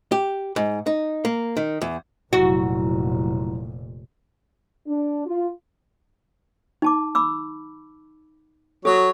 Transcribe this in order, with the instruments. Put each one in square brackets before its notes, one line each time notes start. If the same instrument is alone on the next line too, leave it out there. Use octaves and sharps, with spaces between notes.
[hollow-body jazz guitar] G4
G#2
D#4
A#3
D#3
E2
[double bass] F1 A#2 [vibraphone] F#3 E4 A#5 [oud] F#4
[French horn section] D4
F4
[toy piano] D#4 A5 D6
B5 D6 E6
[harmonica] F#3 C#5 [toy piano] A4 D#6